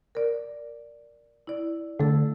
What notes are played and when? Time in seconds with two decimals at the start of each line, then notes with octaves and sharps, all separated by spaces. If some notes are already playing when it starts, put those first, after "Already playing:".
0.15 A#4 D5
1.47 E4 D5
1.99 D3 A3 A4 E6